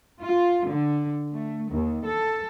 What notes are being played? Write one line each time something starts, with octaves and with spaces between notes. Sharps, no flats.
F4
D3
A3
D#2
A4